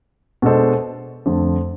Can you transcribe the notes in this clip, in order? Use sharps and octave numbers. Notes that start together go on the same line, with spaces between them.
B2 G#3 D4 A4 C5
F2 D3 A3